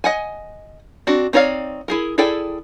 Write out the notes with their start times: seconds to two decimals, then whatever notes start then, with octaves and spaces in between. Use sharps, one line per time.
0.04 D#5 F#5 G#5
1.07 C4 D4 F#4
1.33 C4 D#4 C#5 D5 F5
1.88 E4 G#4 A#4
2.18 E4 G#4 A4 D5 G5